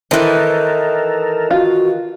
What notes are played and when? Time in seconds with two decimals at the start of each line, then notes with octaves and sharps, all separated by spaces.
0.11 D#3 E3 E4 A4 A#4 C5
1.51 F4 F#4